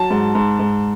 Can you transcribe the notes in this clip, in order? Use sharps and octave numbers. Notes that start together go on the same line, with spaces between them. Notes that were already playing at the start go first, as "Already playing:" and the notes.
Already playing: F#3 A5
G#2
G#2
G#2